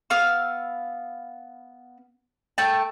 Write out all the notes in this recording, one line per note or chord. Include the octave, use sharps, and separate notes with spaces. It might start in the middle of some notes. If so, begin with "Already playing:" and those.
B3 F5 E6
A3 G5 A5